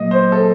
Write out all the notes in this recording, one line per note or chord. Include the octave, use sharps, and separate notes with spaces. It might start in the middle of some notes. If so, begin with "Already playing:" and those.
Already playing: A#2 F#3 A#3 D#5
C5
A4